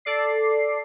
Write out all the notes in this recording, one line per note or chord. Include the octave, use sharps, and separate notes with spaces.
A4 D5 C7